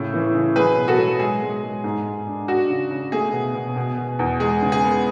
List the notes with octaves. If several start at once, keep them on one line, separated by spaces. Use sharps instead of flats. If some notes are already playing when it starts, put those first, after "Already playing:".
Already playing: A2 C#3
E3
C#3
F#3 G#4 B4
B2
F#4 A4
F#3
G#3 G#4
G#3
G#3
G#2
G#2
D4
D4 F#4
C#3
C#3
A3 G#4
B2
B2
B2
B2
E2
G#3 G#4
C#3
G#4
B3